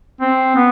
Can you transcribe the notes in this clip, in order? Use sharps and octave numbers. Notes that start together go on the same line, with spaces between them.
C4
B3